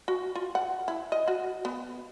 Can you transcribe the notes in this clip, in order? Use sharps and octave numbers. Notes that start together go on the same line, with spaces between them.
F#4
F4
F#5
E4
D#5
F#4
B3